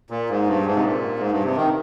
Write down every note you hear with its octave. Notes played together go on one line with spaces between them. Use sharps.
A#2
G#2
G2
G#2
C3
A#2
G#2
G2
C3
D#3